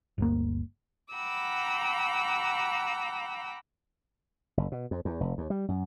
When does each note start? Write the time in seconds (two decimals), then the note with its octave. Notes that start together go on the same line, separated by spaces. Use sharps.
0.18 G1 D2 A#3
1.14 F#5 G5 A#5 B5 D6 E6
4.57 F#1
4.72 B2
4.91 F2
5.05 E2
5.20 F1
5.38 D#2
5.50 G3
5.68 F#2